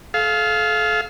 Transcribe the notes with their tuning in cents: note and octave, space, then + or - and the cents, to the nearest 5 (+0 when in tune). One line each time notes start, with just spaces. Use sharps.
A4 -35 F5 +0